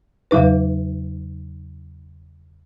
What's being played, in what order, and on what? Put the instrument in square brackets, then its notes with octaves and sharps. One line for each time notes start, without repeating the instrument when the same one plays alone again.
[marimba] E2 C#3 F#3 D#4 B4